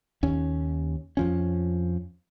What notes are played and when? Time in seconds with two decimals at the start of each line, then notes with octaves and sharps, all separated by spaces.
0.23 D#2 C#4
1.17 F2 F3 C#4